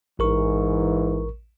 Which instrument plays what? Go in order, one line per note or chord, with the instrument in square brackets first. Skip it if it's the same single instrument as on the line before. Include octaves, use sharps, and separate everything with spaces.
[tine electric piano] A1 A#4 C#6 [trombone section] G#2 E3